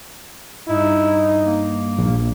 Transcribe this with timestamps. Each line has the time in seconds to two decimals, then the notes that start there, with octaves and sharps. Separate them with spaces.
0.68 G2 D#4 E4
1.45 A#3
1.98 A#1